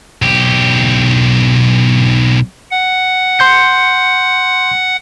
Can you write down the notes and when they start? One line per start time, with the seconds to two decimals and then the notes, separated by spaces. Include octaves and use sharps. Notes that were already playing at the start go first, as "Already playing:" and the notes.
0.22 B1 G4
2.71 F#5
3.39 C6 G6 C#7